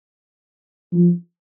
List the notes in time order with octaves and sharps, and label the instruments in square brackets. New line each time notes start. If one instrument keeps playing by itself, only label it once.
[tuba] F3